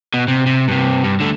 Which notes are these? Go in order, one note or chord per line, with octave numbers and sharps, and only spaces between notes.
B2
C3
C3
G2 C3
G2
D3 A3